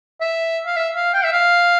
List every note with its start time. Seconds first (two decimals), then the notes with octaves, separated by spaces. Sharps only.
0.21 E5
0.66 F5
0.76 E5
0.96 F5
1.14 G5
1.24 E5
1.33 F5